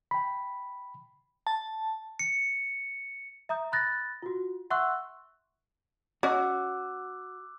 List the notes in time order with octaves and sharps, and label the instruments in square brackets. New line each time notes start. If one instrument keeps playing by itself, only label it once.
[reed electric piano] G5 B5
[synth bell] A5
[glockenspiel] C#7
[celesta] E5 A#5 D#6 G6
B5 D#6 F#6 A6 A#6
F4 F#4
E5 F#5 C6 C#6 E6 F#6
[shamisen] C#4 D#5 [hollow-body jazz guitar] F#4 [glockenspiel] D6 E6 F#6